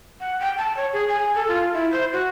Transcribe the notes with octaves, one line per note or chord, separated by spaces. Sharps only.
F#5
G5
A5
C#5
G#4
G#5
A4
F4
E4
C5
F#4